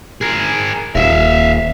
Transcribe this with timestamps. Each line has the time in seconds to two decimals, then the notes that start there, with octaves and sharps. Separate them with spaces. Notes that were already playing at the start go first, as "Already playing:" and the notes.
0.21 G#4 A#4
0.95 D#1 E5 F5